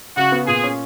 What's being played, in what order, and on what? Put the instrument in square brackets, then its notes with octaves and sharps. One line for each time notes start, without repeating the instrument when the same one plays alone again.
[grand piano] C#3 [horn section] F#4
[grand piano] B3
[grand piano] A#2 [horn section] G#4
[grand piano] C#4